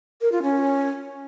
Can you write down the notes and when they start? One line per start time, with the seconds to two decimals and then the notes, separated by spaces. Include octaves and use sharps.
0.21 A#4
0.32 F4
0.43 C#4